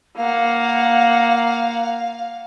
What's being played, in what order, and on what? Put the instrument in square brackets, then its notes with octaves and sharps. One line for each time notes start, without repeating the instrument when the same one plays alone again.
[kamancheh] A#3 F#5 [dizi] F5